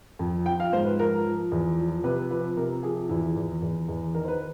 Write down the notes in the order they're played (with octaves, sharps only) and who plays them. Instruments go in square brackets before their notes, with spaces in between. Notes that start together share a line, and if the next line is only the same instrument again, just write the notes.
[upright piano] F2
F3 G5
F5
G#2 C5
B4
F3 A#4
F3
E2
F3
C3 B4
F3 B4
C3 A#4
F3 G#4
E2 E4
E2
E2
E2
D#3 A#4
C5
B4